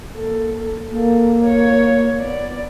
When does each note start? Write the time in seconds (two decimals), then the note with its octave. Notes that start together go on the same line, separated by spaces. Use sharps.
0.16 A#3 A4
0.91 A#3 A4
1.44 C#5
2.18 B3 D5